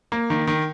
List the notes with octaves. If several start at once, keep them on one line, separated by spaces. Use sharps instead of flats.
A#3
D#3
D#3